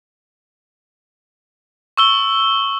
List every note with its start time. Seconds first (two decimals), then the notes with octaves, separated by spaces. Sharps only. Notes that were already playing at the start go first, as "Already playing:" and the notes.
1.97 C#6 E6 G7